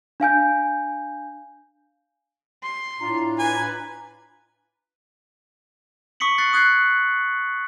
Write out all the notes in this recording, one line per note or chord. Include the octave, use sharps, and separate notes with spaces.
D4 F5 G#5 G6
C6
A2 D4 F4 A#5
B4 G#5
C#6 D#6 B6 C#7 F#7
F#6 A6 C7
D#6 F#6 G#6 C7